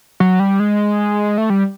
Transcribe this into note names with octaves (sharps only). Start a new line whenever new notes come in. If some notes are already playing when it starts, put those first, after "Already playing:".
F#3
G3
G#3
A3
G3